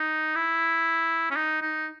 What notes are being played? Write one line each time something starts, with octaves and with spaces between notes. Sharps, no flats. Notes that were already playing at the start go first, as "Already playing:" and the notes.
Already playing: D#4
E4
C#4
D#4
D#4